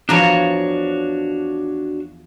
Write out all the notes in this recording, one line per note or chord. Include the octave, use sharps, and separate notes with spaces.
E2 F3 D4 F#4 C#5 A#5